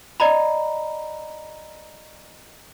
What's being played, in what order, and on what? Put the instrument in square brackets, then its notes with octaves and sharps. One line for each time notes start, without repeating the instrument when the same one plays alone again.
[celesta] D5 D#5 A#5 B5